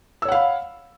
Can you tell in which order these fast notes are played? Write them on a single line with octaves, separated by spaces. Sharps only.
E6 C#5 F#5 F5 B5